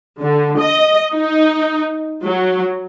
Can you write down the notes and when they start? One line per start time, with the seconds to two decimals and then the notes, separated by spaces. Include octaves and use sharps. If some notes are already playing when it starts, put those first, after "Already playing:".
0.19 D3
0.58 D#5
1.13 D#4
2.22 F#3